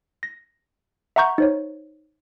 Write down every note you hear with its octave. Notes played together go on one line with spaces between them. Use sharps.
A#6
E5 F#5 A#5 C#6 G6
D#4 C5 C#5